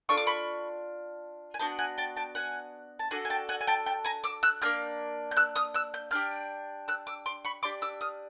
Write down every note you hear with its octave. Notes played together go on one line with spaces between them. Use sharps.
D4 F4 A4 C#6
D6
B5 C#6
G#5
B3 D4 F#4 G5 A5
F#5 G#5
G5 A5
G5 A5
F#5 G#5
A5
D4 F#4 A4 F#5 G#5
G#5
G5 A5
F#5 G#5
G#5
G5 A5
G5 A5
G#5 A#5
D6 E6
E6 F#6
A#3 D4 G4 F6 G6
G6
E6 F#6
D#6 F6
E6 F#6
G6
D4 G4 F6 G6
E6 F#6
D6 E6
C6 D6
B5 C#6
D4 G4 C6 D6
D6 E6
D#6 F6